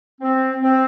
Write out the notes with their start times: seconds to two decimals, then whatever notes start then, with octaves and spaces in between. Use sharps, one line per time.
0.21 C4
0.62 C4